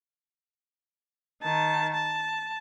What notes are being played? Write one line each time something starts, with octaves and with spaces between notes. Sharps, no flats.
D#3 A5
A5